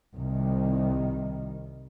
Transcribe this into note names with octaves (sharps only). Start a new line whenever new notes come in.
C2 D#3